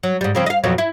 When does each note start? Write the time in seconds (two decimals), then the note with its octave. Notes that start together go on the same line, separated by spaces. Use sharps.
0.03 F#3
0.21 G#2 G3
0.35 C#3 F3 C4
0.46 D#5 F5
0.64 F2 B2 F#3
0.78 E4